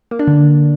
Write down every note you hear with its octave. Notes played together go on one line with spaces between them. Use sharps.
A#3
D4
D3